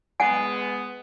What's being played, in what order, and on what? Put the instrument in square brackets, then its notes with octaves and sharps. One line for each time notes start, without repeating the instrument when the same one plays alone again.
[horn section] G#3 B3 [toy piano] F#5 G#5